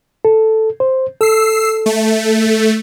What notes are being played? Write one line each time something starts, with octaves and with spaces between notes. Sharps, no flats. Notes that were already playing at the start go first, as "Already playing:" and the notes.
A4
C5
A4 E6 C7
A3